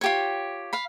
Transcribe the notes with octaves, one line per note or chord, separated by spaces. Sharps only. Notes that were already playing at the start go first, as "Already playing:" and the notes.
F4 G4 C#5
F5 B5